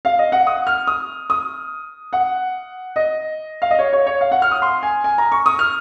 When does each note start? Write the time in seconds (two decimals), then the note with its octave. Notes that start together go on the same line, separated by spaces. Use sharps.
0.05 F5
0.19 D#5
0.32 F#5
0.47 D#6
0.67 F6
0.87 D#6
1.30 D#6
2.13 F#5
2.96 D#5
3.62 F5
3.71 D#5
3.79 C#5
3.93 C#5
4.07 C#5
4.21 F5
4.31 F#5
4.42 F6
4.51 D#6
4.62 C6
4.83 G#5
5.04 G#5
5.18 A#5
5.32 C#6
5.46 D#6
5.59 F6